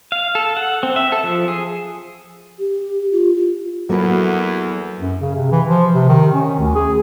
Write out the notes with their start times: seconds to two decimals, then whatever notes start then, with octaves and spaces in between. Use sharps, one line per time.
0.12 F5
0.35 A4
0.57 F#5
0.83 C4
0.96 E5
1.12 A4
1.24 F3
1.48 G#4
2.59 G4
3.12 F4
3.36 F4
3.90 E2 F#3 A#3 F#4 A4 B4
5.00 F#2
5.20 C#3
5.36 C3
5.51 E3
5.68 F3
5.95 C3
6.08 D#3
6.33 C#4
6.59 D2
6.75 G#4